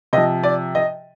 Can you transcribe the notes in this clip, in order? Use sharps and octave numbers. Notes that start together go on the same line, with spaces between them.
C3 F3 D#5
D5
D#5